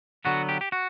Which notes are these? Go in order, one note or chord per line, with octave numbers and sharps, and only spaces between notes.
D3 F#3 B3 F#4
G4
G4
F#4